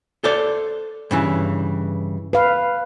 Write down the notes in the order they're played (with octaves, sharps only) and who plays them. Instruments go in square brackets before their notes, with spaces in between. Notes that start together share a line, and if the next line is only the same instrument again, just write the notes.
[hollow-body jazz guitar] A4 C5 D5
G2 C#3 E3
[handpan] B4 F5